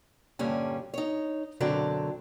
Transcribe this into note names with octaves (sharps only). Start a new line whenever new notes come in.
G2 A#2 D3 G3 C#4
D#4 C#5
F#2 B2 D3 F#3 C4 D4